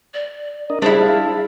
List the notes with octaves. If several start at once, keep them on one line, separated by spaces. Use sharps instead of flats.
D5
D4 A#4 D#5
G3 D4 E4 G#4 C5
F5